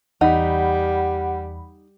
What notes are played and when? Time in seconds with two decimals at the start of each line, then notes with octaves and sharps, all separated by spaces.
0.21 E2 G3 D#4 F#5 B5